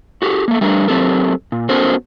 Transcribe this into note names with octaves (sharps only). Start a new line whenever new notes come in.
F#4 G4 A4
A3 A#3
G3 A3 D4 A#4 B4
F#3 C4 G4 A4 A#4
A#2
B3 C#4 F#4 A4 A#4 C5